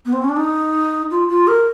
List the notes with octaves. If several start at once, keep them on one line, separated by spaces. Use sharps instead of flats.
B3
C4
C#4
D4
D#4
F4
F4
A#4